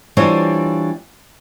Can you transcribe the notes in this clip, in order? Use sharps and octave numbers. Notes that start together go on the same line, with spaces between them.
E3 G3 D4 F4 C5 C#5